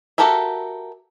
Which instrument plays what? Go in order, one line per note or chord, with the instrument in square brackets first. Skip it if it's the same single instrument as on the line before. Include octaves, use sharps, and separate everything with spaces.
[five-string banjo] F#4 G4 A4 A#4 E5